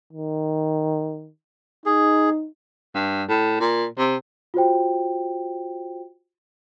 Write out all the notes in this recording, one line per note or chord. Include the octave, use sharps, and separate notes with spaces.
D#3
D#4 G#4
G2
A2
A#2
C3
F4 F#4 C5 G5